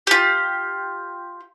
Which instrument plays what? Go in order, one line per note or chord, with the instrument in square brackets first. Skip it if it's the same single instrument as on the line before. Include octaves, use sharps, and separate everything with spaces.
[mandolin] F4 G4